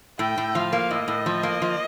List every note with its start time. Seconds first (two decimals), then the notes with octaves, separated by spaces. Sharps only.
0.19 A2 G5
0.38 A2
0.55 F3 F5
0.72 A#3
0.91 A2 D#5
1.08 A2
1.26 F3
1.43 A#3
1.62 F3